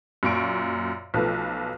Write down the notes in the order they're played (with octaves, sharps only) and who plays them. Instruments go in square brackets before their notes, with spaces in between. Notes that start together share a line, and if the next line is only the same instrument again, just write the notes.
[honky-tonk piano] F#2 A#2 C#6 D7
B1 F3 A3 B4